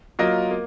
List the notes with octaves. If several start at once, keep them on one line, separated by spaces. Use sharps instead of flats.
F#3 A#3 F4 A#4 D#5
A#3